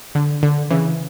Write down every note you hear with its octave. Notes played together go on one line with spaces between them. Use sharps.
D3
D3
C#3 E3